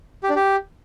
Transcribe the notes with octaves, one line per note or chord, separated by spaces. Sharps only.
G4
D4
G4